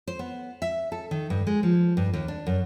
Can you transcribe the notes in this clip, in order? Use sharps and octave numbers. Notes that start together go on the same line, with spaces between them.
C5
B3
E5
A4
D#3
G2
G#3
F3
G2
D#2
D4
F#2